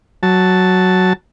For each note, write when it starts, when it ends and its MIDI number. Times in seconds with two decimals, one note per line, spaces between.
0.23 1.13 54
0.23 1.13 81